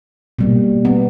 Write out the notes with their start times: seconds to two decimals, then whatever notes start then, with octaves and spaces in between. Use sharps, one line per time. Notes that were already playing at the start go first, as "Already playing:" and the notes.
0.39 B2 G3 A#3
0.85 B3